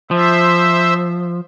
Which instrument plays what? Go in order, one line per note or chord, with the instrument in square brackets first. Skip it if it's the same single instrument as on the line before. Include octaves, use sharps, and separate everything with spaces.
[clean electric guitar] F3 [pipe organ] C5 E5